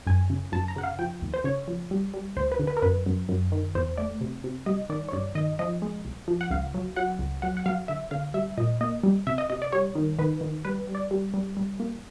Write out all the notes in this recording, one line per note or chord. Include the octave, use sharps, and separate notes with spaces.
F#2 G#5
C#3
F#2 A5
A#5
C#3 F#5
F5
F3 G5
D#2
C5
C#3 C#5
F3
G3
G3
D2 C5
B4
D3
B4
A#4
F#2 B4
F#2
F#2
D#3
E2 C5
A3 D5
C3
C3
G3 D#5
D#3 D5
C#5
G2 D5
D#3 D#5
F3 D#5
G#3
C2
F3
F#5
C#2 F5
F#3
F#3 F#5
C#2
F#3 F#5
F#5
F#3 F5
D3 E5
D3 F5
G3 E5
A#2 D#5
A#3 D#5
G3
C3 E5
D#5
C3 D#5
D5
G3 C#5
D#3
D#3 B4
D#3
G3 B4
G3
D5
G3
G3
G3
A#3